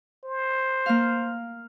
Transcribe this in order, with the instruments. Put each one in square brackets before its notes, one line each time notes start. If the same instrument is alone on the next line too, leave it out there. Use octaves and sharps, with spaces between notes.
[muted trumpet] C5
[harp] A#3 F5